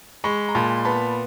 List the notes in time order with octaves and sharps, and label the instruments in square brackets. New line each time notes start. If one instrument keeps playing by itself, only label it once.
[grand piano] G#3 [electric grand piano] B5 C#6
[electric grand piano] A#5
[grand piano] A#2 [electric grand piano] A5 B5
[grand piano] B3 [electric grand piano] A5 B5